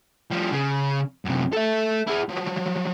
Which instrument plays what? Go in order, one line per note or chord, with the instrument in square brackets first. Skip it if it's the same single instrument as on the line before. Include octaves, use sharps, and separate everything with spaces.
[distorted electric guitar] F3 G3
C#3
F#2 C3
A4 E5
E4 G#4
F3 F#3